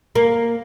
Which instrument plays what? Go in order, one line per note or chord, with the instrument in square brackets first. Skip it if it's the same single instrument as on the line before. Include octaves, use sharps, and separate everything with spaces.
[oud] A#3